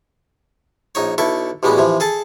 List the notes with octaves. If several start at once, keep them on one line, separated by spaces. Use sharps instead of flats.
A#1 D#4 C#5
B1 E4 A4 C#6
A1 B2 G3 G#3 B3
C3 E3 F3
G#4 A4 A5